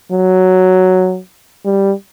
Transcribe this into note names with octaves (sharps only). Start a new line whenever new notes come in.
F#3
G3